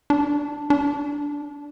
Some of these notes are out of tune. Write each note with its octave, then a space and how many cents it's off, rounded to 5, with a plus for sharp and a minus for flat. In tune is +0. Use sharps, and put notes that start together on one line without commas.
D4 +0
D4 -10